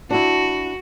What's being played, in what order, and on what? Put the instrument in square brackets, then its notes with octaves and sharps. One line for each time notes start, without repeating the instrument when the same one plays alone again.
[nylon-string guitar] D4 E4 [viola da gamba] F#4